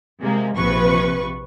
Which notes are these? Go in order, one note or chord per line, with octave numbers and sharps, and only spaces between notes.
C3 G#3 A#3
A#1 C3 F3 B4 C#6